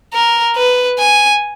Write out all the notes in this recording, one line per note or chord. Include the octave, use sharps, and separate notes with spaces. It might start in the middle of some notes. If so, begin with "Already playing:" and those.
A#4
B4
G#5